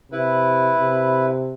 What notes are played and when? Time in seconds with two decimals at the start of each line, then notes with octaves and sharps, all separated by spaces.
0.12 C3 E4 B4
0.80 C3